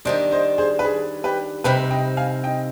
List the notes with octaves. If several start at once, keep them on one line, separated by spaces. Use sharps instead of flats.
D#3 G3 D4 C5 D#5
C5 D#5
G#4 C5
B4
G#4
G4 B4
C3 G3 C4 D#4 G4 B4
D#5 G5
F5 G#5
D#5 G5